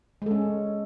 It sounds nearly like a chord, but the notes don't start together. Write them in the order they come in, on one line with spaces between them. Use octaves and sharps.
G#3 A4 C#4